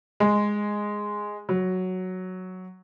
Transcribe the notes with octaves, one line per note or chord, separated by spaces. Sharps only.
G#3
F#3